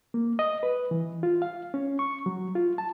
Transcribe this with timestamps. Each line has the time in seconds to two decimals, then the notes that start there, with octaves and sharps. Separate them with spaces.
0.14 A#3
0.39 D#5
0.63 B4
0.91 E3
1.23 F4
1.42 F5
1.74 C#4
1.99 C#6
2.26 F#3
2.55 F4
2.78 A5